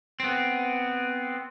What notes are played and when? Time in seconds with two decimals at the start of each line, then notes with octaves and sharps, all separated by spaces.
0.20 B3 C4